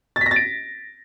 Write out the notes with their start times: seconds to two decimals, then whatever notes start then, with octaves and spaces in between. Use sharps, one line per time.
0.16 A6
0.21 B6
0.26 A#6
0.31 A6
0.36 D7